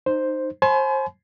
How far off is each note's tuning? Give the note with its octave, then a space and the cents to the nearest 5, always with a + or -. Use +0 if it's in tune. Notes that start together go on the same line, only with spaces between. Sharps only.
D#4 -20 C5 +0
C5 +30 G#5 +40 B5 +45